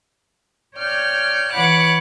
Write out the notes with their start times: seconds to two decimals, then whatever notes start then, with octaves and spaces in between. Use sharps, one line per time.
0.76 C#5 D5 G5 F6 G6
1.52 E3 C#5 F#5 B5 D6 F#6